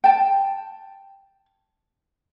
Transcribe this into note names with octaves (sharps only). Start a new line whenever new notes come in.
G5 A5